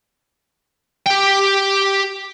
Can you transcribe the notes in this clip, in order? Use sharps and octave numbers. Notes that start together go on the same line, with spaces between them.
G4 G5